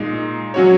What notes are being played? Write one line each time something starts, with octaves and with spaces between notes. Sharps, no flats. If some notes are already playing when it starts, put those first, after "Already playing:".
Already playing: A#2 G#3 D#4
F#3 C#4 F#4 C#5